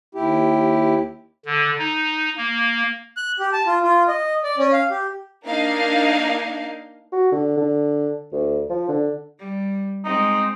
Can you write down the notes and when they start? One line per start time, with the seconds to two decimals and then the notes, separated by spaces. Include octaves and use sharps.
0.15 D#2 E4 G4
1.45 D3
1.78 D#4
2.37 A#3
3.17 F#6
3.39 G4
3.53 A5
3.66 F4
3.83 F4
4.08 D#5
4.44 D5
4.58 C#4
4.73 F5
4.90 G4
5.45 A#3 D4 D#4 F5
7.12 F#4
7.32 D3
7.57 D3
8.32 D2
8.70 F3
8.88 D3
9.39 G3
10.05 G#3 C4 D#4